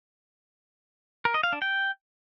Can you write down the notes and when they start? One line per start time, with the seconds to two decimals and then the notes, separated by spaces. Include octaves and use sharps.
1.25 A#4
1.34 D#5
1.43 F5
1.53 D4
1.62 G5